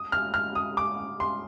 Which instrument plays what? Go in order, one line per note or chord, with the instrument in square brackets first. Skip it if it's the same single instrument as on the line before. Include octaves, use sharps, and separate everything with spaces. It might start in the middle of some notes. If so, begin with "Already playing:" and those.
Already playing: [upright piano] D#6
F6
F6
D#6
D6
C6